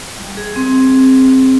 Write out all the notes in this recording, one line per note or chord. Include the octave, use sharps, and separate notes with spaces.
G3
G#4
C4